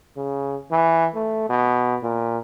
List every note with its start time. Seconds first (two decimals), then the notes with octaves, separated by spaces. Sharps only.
0.17 C#3
0.72 E3
1.15 A3
1.49 B2
2.03 A#2